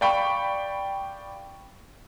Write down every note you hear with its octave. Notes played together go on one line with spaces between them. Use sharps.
D5 F5 G5 B5 C#6